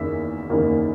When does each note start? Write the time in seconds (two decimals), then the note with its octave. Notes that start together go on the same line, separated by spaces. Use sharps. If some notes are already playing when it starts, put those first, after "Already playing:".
Already playing: F#1 E2 D#3 A#3 C#4 E5
0.50 F#1 E2 D#3 A#3 C#4